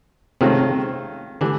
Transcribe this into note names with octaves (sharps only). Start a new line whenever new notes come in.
C3 D#3 G#3 C4 C#4 F4 A4
D3 E3 G3 D4